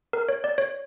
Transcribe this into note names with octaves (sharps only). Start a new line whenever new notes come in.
A#4
C#5
D5
C#5